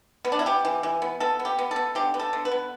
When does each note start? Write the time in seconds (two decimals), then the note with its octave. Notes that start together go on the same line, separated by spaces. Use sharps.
0.25 B3
0.32 D4
0.39 E4
0.46 B3 G4
0.65 E3
0.83 E3
1.02 B3
1.20 B3 A4
1.39 B3
1.45 G4
1.59 B3
1.71 A4
1.76 B3
1.95 D3 G4
2.14 B3
2.19 A4
2.33 D3
2.45 B4
2.51 B3